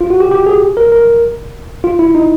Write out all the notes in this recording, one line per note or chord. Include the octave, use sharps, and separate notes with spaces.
F4
F#4
G4
G4
G#4
A#4
A#4
F4
E4
D#4